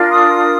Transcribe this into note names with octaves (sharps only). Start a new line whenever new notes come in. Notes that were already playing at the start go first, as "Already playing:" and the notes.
Already playing: D4 F4 A#4
D#6